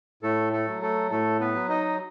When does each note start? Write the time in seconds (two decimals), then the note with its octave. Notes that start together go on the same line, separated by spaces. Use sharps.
0.23 A2 A3 A4
0.53 A3 A4
0.67 F#3
0.81 A3 A4
1.11 A2 A3 A4
1.40 B3 B4
1.55 F#3
1.69 D#4 D#5